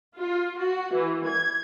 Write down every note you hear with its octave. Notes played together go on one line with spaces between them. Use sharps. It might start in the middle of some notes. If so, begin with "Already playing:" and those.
F4
F#4
E3
G#6